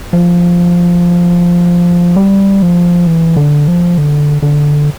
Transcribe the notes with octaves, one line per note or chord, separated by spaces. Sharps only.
F3
G3
F3
E3
D3
F3
D3
D3